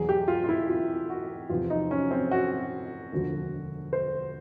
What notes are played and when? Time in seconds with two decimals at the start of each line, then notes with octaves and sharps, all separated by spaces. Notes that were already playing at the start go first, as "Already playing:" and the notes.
Already playing: E2 B2 F#3 G#4
0.09 G4
0.28 F4
0.44 F4
0.49 E4
0.69 F4
1.10 F#4
1.49 E2 C3 F3 F4
1.70 D#4
1.91 C#4
2.11 C4
2.31 F#4
3.12 E1 D2 D3 F3
3.93 C5